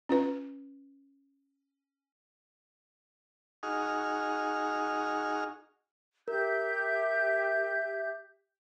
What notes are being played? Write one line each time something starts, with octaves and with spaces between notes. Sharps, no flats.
C#4 F4 B4
D#4 F#4 G#4 F6
G4 A#4 E5 G6